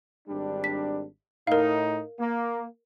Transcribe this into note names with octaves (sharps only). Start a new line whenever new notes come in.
G#1 G3 D4
B6
A2 D#4 A#4 F5
A#3